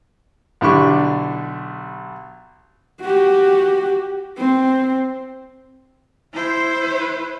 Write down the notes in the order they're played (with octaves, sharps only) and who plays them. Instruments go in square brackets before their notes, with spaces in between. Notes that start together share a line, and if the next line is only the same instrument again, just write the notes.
[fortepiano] B1 D3 D4 E4 G4 C#6
[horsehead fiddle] F#4 G4
C4
E4 C5